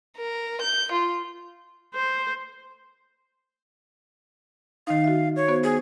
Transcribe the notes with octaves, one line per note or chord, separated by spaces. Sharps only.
A#4
G6
F4
C5
D#3 D#4 F5
F#4 E5
C#5
B3 F#4 C5
G#4